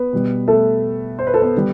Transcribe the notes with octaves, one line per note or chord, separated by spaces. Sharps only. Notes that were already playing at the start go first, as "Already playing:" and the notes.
Already playing: B3 B4
B2 G3
A3 A4
C5
B4
A4
B3 B4
D3 G3